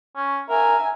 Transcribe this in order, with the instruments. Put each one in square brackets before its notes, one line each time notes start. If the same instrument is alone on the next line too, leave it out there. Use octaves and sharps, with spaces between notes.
[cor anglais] C#4
[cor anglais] A#4 [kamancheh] E5 G#5